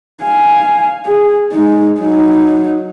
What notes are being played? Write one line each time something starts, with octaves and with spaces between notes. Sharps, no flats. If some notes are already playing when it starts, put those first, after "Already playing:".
F5 G#5
G#4
G#3 D#4
F#3 D#4